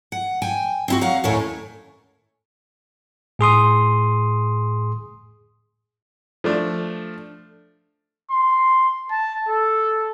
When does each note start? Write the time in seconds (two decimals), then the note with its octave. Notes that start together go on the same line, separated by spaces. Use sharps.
0.12 F#5
0.42 G5 G#5
0.88 C4 E4 F#4
1.01 F#3 F5 F#5
1.24 D#2 A2 A3 C#4 E4 C#5
3.39 A2 G#4 C6 D#6
6.44 F3 A3 D4
8.31 C6
9.11 A5
9.48 A4